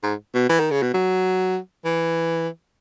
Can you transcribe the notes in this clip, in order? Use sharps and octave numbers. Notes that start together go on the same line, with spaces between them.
G#2
B2
E3
D#3
C#3
B2
F#3
E3